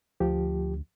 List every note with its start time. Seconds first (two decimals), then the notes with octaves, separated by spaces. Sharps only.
0.20 D2 F3 G4